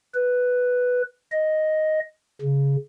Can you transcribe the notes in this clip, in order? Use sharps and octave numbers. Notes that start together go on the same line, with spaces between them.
B4
D#5
C#3